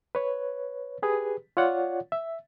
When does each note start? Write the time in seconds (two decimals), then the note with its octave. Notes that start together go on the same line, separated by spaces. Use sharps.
0.15 B4 C#5
1.02 G4 G#4 B4
1.57 F4 C#5 D5 F#5
2.12 E5